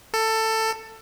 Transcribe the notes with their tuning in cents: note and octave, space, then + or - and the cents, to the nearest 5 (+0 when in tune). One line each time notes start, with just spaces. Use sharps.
A4 +15